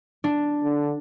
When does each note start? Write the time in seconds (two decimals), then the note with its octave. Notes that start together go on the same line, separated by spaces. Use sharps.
0.24 D4
0.64 D3